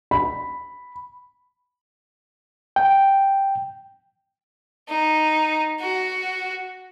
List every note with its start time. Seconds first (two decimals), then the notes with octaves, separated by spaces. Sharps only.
0.11 B5
2.76 G5
4.89 D#4
5.81 F#4